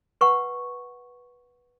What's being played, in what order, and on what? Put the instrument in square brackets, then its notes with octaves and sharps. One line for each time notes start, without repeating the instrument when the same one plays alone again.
[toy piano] B4 F#5 C#6